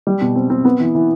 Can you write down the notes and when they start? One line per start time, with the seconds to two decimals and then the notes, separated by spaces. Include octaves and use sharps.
0.07 G3
0.22 B2
0.35 C4
0.50 C4
0.65 B3
0.80 E3
0.95 E3